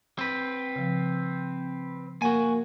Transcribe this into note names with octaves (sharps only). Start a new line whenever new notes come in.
C4 B4
C#3 F3
A#3 F#4 F#5 G#5